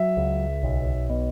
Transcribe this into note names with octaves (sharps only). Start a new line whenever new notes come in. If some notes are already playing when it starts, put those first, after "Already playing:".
Already playing: F#3 E5
C#2
B1
B2